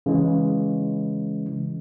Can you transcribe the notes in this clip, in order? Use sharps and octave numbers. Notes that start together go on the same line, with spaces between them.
C#3 E3 G#3